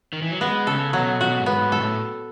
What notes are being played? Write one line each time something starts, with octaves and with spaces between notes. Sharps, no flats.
D#3
E3
F#3
G#3 B3
C#3 A4
B2 F#3
B2 F#4
G#2
B3
G#2
A4
A2